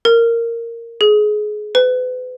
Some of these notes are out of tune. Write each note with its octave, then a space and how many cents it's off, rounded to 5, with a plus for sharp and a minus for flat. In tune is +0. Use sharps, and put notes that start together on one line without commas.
A#4 -10
G#4 +25
B4 +35